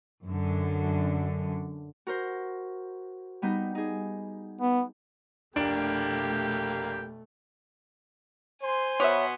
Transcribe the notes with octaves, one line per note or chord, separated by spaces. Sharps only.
F#2 D3
F#4 A#4 C5
G3 B3 D#4
D#4 G#4
B3
F1 B2 A3 A#3 D4 G4 G5 D7
C5 G#5 C6
B2 B3 C#5 E5